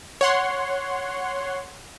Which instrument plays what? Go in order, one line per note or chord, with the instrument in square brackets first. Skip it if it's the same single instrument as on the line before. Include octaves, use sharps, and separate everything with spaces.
[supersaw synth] C#5 F#5 C6